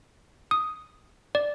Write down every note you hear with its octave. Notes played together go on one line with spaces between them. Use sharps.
D#6
D5